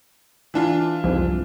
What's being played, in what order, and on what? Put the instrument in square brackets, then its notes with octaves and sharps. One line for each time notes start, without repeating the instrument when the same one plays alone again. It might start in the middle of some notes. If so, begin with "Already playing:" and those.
[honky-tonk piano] E3 D4 F4
[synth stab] C2 F2 G#2